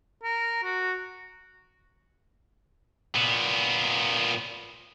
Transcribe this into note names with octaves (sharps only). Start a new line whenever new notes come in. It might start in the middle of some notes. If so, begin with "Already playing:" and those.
A#4
F#4
A#2 B3